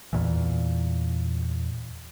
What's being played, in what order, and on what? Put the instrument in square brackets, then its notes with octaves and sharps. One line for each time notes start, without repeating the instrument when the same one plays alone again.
[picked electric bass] E2 A#2 E3